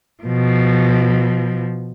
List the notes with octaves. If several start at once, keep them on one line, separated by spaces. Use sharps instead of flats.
B2 F3